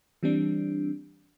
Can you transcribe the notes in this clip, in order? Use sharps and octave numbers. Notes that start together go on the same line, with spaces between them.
E3 G3 C4 D4